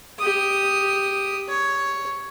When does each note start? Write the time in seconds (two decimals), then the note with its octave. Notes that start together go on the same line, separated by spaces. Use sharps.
0.18 G4 D#6
1.48 C#5